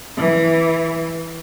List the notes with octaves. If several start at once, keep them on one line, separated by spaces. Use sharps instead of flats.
E3